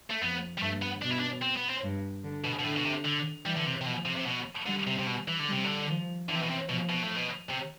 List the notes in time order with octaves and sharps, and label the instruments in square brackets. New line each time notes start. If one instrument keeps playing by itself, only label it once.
[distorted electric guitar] A3
[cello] F2 [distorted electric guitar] B3
[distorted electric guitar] G3
[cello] G2 [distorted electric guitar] A3
[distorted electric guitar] B3
[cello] B2 [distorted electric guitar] D4
[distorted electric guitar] E4
D4
C4
B3
C4
[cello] G2
D3
[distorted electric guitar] B2
B2
[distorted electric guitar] A2 [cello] D3
[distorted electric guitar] B2
C3
D3
[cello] E3 [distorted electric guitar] G3
[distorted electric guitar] D3
C3
C3
[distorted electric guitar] B2 [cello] F3
[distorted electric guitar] C3
C3
B2
[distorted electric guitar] D3 [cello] G3
[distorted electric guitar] C3
C3
B2
E3
D3
[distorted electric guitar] C3 [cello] G3
[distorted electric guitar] D3
[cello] F3
[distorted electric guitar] D3 [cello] E3
[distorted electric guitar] C3
B2
C3
[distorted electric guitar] B2 [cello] F3
[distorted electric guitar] B2
A2
B2
C3